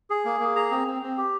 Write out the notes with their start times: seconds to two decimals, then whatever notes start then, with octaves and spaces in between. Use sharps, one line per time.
0.10 G#4
0.25 A#3
0.40 A#3
0.56 G#4 A#5
0.71 C4
0.87 C4
1.03 C4
1.18 G4